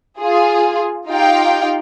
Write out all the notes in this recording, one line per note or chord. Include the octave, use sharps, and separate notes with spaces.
F4 G#4
D#4 F4 G4 F5 G5